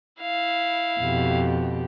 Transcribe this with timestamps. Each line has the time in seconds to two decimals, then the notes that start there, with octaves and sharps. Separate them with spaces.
0.21 E4 F5
1.00 F2 B2 G4